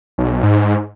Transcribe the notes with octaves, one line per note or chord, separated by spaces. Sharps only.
B1
G#2